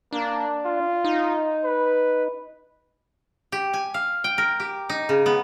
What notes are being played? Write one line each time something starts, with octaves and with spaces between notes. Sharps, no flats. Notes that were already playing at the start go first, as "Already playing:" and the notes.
A#3 D4
F4
D#4
B4
G4
G#5
F5
G5
A#4
G4
D#4
C#3
B3